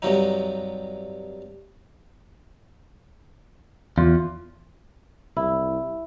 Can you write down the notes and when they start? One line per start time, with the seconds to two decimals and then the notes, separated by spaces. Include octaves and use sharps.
0.02 G2 C3 F#3 D#4
3.98 E2 F4
5.37 C2 E4